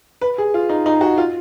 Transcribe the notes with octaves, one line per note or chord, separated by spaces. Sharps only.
B4
G#4
F4
D#4
D#4
F#4
F4